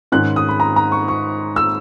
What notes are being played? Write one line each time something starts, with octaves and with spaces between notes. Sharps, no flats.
G#2 D#3 G#3 C#4 F#6
D#6
B5
A#5
A#5
C#6
C#6
E6